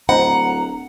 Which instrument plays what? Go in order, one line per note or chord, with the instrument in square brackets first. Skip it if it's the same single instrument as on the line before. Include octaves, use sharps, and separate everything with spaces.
[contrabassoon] D1 [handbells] C5 D#5 B5 [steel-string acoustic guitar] F#5 [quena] A#5